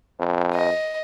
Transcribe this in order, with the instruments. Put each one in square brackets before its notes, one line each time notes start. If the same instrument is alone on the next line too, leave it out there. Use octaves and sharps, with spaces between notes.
[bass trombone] F2
[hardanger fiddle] D#5